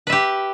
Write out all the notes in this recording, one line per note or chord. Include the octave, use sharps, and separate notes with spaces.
G4 B4 E5